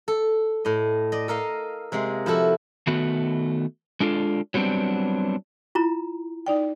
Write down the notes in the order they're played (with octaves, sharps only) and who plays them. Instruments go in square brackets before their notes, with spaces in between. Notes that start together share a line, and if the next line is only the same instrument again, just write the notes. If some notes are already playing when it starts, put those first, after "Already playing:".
[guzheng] A4
A2 D#5
D5 D#5
A4 A#4 D#5 F5
C3 G#3 A#3 G#4
F3 E4 F#4 A4
[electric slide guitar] D#3 A3 B3 F#4
G#3 D4 F4 A4
F#3 G3 B3 C4 D4
[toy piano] E4 F4 A#5
[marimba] D#4 D5 G5